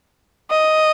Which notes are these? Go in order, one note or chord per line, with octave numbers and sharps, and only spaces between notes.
D#5